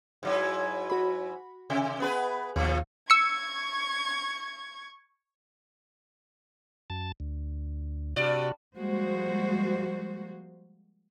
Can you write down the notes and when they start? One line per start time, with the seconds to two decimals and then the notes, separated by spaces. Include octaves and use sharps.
0.23 G#2 F#3 E4
0.90 F#4 B5
1.70 C3 E5
2.00 B3 G#4 B4
2.56 D#2 A#2 F3
3.10 C#6 E6 G#6 C#7
6.90 F#2 A5
7.20 D2
8.16 G2 C3 F#4 D5
8.76 F3 G3 G#3 A#3 F#4 C5